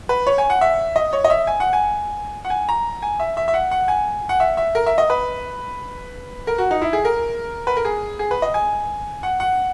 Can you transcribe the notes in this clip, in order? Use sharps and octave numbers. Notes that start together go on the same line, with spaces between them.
B4
C#5
G#5
F#5
E5
D#5
C#5
D#5
E5
G#5
F#5
G#5
F#5
G#5
A#5
G#5
E5
E5
E5
F#5
F#5
G#5
F#5
E5
E5
A#4
E5
D#5
B4
A#4
F#4
D#4
E4
G#4
A#4
B4
A#4
G#4
G#4
B4
D#5
G#5
F#5
F#5